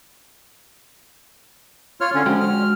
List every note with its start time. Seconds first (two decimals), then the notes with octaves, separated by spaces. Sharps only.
2.01 F4 C#5 F6
2.14 D3 C#4
2.26 F3 G#3 F#4 G5
2.40 F6